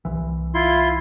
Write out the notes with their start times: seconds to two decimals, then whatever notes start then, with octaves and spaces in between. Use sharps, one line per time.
0.05 C2 E3
0.54 E4 F4 C6